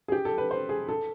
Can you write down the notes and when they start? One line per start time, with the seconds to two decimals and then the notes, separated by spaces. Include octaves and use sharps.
0.08 G#4
0.12 G4
0.25 A4
0.38 B4
0.51 C5
0.69 G#4
0.88 A4